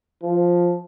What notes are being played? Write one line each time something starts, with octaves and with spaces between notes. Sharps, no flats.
F3